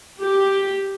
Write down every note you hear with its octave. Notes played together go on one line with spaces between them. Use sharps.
G4